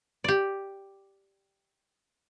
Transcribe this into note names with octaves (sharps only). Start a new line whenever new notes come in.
G4 D5